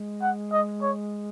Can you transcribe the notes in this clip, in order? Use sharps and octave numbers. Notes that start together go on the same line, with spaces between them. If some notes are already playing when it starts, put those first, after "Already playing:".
Already playing: G#3
F#5
D#5
C#5